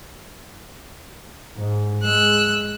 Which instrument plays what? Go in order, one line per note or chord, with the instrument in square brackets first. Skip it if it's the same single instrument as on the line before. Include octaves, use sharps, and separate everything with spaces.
[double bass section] G#2
[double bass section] G#3 [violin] E6 F#6